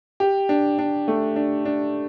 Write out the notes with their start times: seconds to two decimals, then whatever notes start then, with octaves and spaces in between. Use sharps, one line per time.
0.20 G4
0.49 D4
0.79 D4
1.08 A3
1.36 D4
1.65 D4